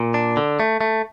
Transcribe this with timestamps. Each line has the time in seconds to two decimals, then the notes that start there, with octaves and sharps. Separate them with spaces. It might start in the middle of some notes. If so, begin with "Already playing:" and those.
Already playing: A#2
0.14 D4
0.37 D3
0.60 A3
0.81 A3